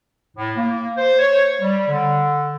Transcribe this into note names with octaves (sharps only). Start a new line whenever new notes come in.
A2
A#3
C5
C#5
G3
D3